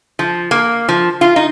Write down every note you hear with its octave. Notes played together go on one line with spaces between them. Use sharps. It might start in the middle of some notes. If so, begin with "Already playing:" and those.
F3
A#3
F3
F4
D#4